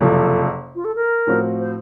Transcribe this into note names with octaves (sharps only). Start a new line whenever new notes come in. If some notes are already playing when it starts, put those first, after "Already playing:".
F#1 F2 C3 F3 A4
F4
A4
A#4
A2 F3 C4 F#4
C5